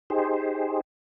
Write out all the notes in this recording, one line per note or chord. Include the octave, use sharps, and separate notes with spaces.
D#4 G4 G#4 C5